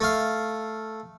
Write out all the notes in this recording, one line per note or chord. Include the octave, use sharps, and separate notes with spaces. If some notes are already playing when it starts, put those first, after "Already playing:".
A3 F5